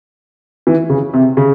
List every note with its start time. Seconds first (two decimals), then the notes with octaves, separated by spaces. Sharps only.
0.67 E3
0.90 C#3
1.14 C3
1.37 C#3